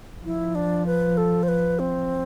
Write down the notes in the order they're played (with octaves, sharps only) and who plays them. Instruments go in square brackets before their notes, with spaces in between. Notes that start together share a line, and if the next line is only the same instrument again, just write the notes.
[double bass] F3 [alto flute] E4
[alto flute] D4
B4
A4
C5
B4
C4